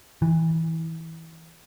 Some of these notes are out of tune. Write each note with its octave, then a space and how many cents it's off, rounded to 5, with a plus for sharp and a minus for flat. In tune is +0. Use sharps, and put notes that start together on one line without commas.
E3 -20